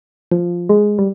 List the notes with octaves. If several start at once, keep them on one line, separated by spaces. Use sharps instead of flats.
F3
G#3
G3